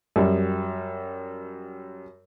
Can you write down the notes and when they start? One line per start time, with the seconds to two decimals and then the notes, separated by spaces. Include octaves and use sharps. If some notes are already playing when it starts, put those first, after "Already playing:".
0.16 F#2 G3